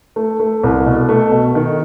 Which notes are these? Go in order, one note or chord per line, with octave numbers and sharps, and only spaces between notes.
A3
A3
C2
B2
A3
B2
D#3